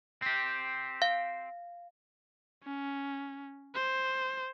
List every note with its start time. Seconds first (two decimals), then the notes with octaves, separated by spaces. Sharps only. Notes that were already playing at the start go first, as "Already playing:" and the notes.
0.22 C4 G4
1.02 F5
2.64 C#4
3.74 C5